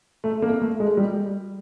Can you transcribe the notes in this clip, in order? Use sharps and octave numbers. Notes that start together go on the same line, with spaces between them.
A3
A#3
A3
G#3
G3